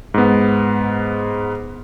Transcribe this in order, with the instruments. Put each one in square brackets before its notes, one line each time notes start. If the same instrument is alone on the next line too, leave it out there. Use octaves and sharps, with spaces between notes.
[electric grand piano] G#2 B3